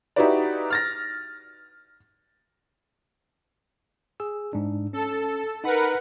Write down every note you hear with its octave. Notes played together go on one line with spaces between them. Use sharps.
D#4 E4 F#4 G4 B4 D5
F6 A6 A#6
G#4 E6
G#2 D4
C#4 A4
D#4 A#4 B4 F#5 B5